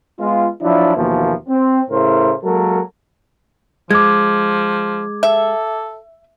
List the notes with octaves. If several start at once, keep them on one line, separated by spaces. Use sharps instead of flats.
G#3 B3 F4
F3 F#3 D4 E4
D#2 B2 E3 F3 A#3
C4
A2 C#3 E4 A#4 C5
F#3 G#3 A#3 A4 A#4
F3 G#3 D6 G#6
A4 E5